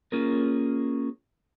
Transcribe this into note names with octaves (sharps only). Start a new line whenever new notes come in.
A#3 C#4 F4 G#4 A#4